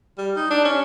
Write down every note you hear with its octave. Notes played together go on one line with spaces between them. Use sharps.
G3
D#4
D4
C#4